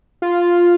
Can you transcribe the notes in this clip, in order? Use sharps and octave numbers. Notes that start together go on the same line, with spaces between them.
F4